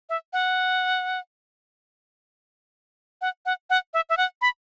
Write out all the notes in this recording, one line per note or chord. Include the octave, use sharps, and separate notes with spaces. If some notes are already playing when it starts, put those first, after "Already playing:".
E5
F#5
F#5
F#5
F#5
E5
E5
F#5
B5